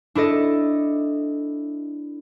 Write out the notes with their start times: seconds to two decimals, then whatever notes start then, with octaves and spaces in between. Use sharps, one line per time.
0.15 D4 E4 A4 D#5